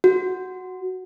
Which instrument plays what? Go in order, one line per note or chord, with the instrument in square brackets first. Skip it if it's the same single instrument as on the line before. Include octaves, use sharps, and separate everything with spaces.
[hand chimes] F#4